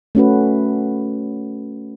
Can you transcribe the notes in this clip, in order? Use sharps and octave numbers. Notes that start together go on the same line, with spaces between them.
A3 C#4 F#4 B4